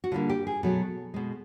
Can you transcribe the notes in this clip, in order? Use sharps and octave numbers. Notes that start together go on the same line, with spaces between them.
F#4
D3 G3 A#3 F4
G4
G#4
B2 F#3 A3 A4
B2 G#3